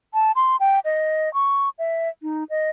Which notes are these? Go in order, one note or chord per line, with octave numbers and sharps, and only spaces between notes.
A5
C6
G5
D#5
C#6
E5
D#4
D#5